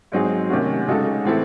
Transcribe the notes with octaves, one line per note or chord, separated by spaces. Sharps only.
G#2 F#3 C4 D#4 G#4
C3 D#3 A3 C#4 F#4
C#3 G#3 D#4 F#4 A4
A2 E3 C4 E4 A4